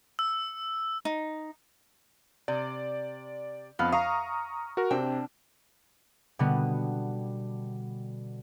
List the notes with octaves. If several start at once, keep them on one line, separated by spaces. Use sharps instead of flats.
E6
D#4
C3 D5
F2 B3 F5 F6
F5 A#5 C#6 D#6
F#4 A#4
C3 C4 D4 G5
B2 D3 G3 B3